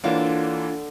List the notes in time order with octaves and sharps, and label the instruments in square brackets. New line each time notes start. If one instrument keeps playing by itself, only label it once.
[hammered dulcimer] D3 [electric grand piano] E3 A#3 [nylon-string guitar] D4 C#5 F5 [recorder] F4